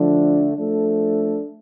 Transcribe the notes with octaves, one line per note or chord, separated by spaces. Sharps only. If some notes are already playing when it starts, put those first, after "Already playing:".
Already playing: D3 F3 A3 D4
F3 A3 D4 A4